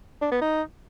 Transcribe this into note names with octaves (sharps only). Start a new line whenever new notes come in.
D4
B3
D#4